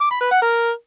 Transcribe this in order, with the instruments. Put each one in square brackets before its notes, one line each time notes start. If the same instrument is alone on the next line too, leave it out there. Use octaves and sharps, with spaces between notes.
[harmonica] D6
B5
B4
F#5
A#4